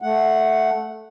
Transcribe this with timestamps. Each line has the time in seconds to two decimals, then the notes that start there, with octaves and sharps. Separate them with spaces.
0.02 A3 F#5